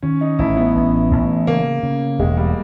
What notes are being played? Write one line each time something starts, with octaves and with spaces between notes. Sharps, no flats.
D#3 C#4
D#4
A1 E4
B3
A1
A1
C#3 A#3
C#3
E1 G#3
G3